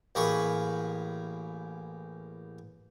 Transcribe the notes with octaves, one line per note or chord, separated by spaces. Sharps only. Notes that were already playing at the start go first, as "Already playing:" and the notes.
A1 A#3 G#4 B5 C#6